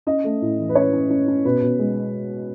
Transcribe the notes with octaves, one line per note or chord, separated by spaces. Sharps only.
C#4 D#5
A3
A2
E3
B4
C#4 C#5
C#4
C#4
C#4
B2 B4
B2
G#3